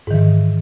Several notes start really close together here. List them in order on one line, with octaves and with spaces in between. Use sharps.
G#2 D#3 E3